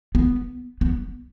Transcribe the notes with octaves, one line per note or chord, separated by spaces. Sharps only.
B3
B3